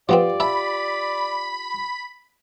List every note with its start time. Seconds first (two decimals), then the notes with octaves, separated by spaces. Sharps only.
0.09 F3 B3 C4 F4 G4 D5
0.40 E5 A5 B5